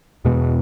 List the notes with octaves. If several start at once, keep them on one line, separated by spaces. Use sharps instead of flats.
E2 B2 G#3